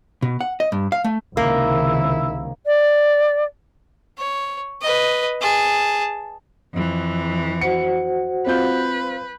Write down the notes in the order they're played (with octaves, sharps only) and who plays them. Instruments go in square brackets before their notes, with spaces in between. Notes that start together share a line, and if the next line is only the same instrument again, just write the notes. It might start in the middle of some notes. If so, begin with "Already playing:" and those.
[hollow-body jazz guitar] B2
F#5
D#5
G2
F5
A3
[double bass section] C#2 C3 D#3 [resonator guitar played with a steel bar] A#3 [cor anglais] E4
[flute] D5
[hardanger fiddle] C#5
B4 D#5
G#4 A5
[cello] F2 E3
[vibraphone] F#4 C5 F#5 [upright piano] C#7
[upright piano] C4 F4 G6 [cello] B4